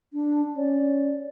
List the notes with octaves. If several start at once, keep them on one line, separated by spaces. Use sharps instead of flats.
D4
C#4 D5